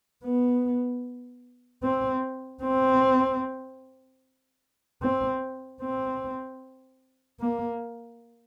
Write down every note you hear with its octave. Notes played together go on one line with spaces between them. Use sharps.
B3
C4
C4
C4
C4
A#3